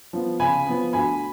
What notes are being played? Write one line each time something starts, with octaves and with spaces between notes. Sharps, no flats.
F3 B3
C#3 G#5 B5
F3 B3
D2 G#5 B5